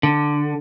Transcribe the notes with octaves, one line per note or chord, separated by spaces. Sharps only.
D3